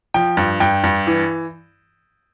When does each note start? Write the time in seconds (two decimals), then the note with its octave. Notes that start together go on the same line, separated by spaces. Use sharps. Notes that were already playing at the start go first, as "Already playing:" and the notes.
0.14 F3 G5
0.37 G2
0.60 G2 G5
0.84 G2
1.07 E3